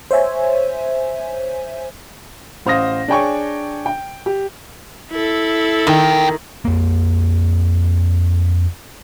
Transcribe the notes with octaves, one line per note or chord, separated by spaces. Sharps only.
C5 C#5 E5 G#5
A1 C5 F5 D#6 A#6
D4 G#4 C#5 G5 G#5 C#6
G5
G4
E4 A4
E2 D#3 G5
F2 A#3